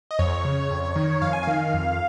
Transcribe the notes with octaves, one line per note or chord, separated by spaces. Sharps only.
D#5
F2 C#5
C#3
F2
D#3
F2 F5
G#5
D#3 F5
F2